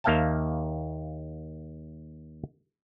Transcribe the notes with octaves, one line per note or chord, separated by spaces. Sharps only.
D#2 A#3 E5 F5 G5 A5